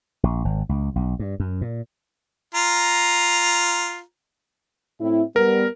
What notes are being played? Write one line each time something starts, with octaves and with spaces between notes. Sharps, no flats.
A#1
G#1
C#2
B1
G2
F#2
A#2
F4 A#5
A2 C4 E4
G3 B3 A#4